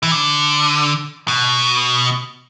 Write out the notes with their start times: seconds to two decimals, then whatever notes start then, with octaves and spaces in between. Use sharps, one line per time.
0.03 E3
0.12 D3
1.28 B2